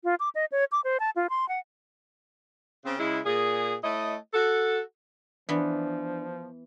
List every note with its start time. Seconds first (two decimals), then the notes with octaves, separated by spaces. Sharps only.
0.04 F4
0.20 D6
0.35 D#5
0.52 C#5
0.72 D6
0.84 C5
1.00 A5
1.16 F4
1.30 C6
1.49 F#5
2.85 C#3 C4
2.99 C#3 G#3 E4
3.25 A#2 G#4
3.83 A3 E4 C#5 D#5
4.34 F#4 A4
5.49 E3 F3 B3 D4